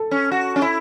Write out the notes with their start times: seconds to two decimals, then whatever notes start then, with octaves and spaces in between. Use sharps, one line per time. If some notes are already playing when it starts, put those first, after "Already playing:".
Already playing: A4
0.11 C#4
0.31 F#4
0.56 C#4
0.62 E4